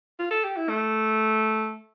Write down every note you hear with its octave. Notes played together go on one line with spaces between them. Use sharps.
F4
A4
G4
E4
A3